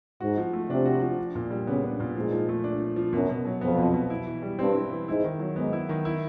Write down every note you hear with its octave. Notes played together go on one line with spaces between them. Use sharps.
G#2 F#4
F3
A3
C3 D4
F#4
F3
D4
A#2
G3
C#3 B3
D4
A#2
G#2 F3
F3
A3
D4
F3
F3
F#2 B2
B2
F#3
F2 B3
B2
B2
E4
E3
G3
G2 C4
E4
E3
G#2 E4
D#3
F#3
G#2 B3
E4
D#3
E4